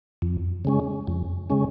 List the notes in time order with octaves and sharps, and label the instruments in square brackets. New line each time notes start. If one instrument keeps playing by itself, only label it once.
[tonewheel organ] F2
C#3 G#3 C#4
F2
C#3 G#3 C#4